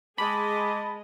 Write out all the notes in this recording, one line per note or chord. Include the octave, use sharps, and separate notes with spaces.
G#3 G#4 D#5 A5 B5 D6